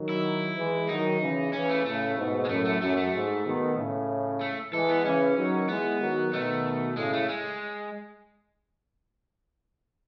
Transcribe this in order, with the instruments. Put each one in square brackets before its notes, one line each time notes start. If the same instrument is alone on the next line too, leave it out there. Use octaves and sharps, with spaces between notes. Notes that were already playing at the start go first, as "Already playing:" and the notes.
Already playing: [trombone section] D#3 F#3
[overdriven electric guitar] E4
[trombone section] E3 G#3
[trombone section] D#3 F#3 [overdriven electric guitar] D#4
[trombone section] C#3 E3
[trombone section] C#3 E3 [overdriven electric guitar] C#4
[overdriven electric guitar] A3
[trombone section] A2 C#3 [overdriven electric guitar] A3
[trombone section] G#2 B2
[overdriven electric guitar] G#3
[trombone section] F#2 A2 [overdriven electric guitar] A3
[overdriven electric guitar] A3
[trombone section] F#2 [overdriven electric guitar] A3
[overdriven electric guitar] A3
[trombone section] G#2
B2 D#3
A2 C#3
[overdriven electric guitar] A3
[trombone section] E3 G#3 [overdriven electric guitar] A4
[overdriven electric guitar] B3
[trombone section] C#3 E3 [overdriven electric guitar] C#4
[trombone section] D#3 F#3
[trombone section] E3 G#3 [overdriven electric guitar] B3
[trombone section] D#3 F#3
[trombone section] B2 D#3 [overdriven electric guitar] A3
[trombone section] A2 C#3 [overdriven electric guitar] G#3
[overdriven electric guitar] A3
G#3